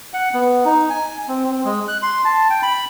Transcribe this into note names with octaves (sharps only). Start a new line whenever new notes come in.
F#5
B3
D#4
G#5
C4
C4
G#3
F#6
C6
A5
G5
B5